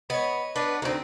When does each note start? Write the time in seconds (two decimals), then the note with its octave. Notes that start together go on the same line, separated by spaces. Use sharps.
0.10 B3 C#5 D#5 B5
0.56 B3 D4 B4
0.82 D2 A#3 C4 D#4